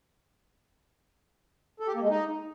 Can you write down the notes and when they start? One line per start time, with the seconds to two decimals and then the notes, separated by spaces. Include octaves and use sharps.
1.80 A4
1.87 G4
1.95 A#3
2.02 G#3
2.09 D#4